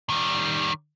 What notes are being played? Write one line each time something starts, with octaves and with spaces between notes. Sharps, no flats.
D#3 G3